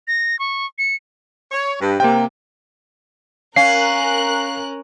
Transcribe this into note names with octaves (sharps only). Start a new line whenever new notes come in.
A#6
C#6
C#7
C#5
G2
C3 A#3 G5
C#4 A#4 F5 F#6 C7